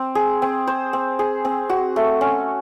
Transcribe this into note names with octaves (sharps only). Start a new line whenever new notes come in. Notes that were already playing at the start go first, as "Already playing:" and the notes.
Already playing: C4
G#4
C4
C5
C4
G#4
C4
F#4
A3
C#4